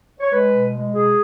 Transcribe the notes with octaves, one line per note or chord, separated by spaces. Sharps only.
C#5
G#3 B4
B2
G#3
B2 G#4